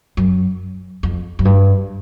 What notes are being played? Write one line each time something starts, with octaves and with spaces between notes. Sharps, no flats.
F#2
F2
F#2
G2